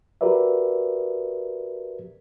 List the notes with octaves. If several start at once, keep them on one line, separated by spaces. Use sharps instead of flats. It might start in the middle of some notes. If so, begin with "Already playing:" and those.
F#4 G4 A#4 B4 D5 E5